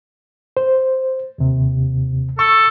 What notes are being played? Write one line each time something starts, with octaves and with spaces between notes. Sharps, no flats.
C5
D#2 C3
A4 C#6